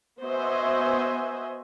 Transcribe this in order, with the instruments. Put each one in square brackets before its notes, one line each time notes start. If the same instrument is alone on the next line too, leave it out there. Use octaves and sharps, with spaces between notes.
[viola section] B3 F#4 C5 D#5 E5 G#5